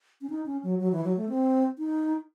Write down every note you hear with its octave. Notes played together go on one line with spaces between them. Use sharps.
C#4
D#4
C#4
F#3
F#3
E3
F#3
A3
C4
D#4